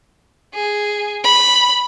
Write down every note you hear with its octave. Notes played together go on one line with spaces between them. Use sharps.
G#4
B5